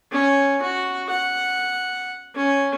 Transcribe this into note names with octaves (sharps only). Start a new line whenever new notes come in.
C#4
F#4
F#5
C#4